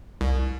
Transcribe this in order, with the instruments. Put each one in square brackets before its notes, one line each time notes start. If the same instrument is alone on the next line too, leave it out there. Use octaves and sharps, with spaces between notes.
[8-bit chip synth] C2